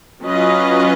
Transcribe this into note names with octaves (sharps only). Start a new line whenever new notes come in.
F#3 C#4 F4 B4 D#5